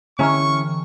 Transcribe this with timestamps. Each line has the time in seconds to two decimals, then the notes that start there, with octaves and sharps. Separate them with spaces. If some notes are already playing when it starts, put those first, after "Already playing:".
0.19 D3 E3 C#4 E4 A#5 C#6 F6